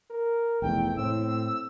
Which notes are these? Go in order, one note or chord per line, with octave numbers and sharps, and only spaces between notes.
A#4
F1 E2 A3 G5
A2 C4 E6